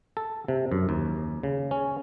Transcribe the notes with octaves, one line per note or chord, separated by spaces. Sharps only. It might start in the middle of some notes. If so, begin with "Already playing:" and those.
A4
C3
F#2
D#2
C#3
C#4